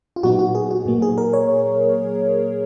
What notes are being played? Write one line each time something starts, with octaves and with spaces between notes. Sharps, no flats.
F4
A#2 F#3 B3 D#4 F#4
F#4
G#4
F#4
A#2 F#3 A#3
G#4
A#4
C#5